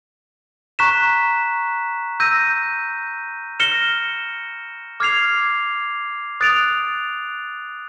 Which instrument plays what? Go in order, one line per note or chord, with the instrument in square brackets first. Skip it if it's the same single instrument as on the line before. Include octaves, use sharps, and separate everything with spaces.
[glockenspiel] A#5 C#6 F#6 B6 E7
E6 G6 A#6 D#7
F6 A#6 C#7 E7 G7
D6 F6 G#6 C7 F7
D#6 F#6 A6 D7 F7